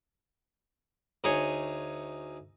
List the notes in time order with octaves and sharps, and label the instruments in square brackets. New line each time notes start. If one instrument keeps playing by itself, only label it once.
[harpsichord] D2 D#4 G#4 C#5 G#5 C#6